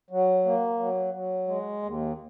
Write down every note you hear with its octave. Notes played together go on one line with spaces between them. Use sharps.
F#3
A#3
F#3
F#3
G#3
D#2